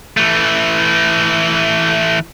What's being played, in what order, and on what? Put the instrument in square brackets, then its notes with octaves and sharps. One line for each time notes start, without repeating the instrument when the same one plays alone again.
[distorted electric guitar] E3 A3